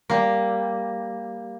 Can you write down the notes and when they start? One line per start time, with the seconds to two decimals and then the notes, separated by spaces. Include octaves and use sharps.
0.10 G3 A#3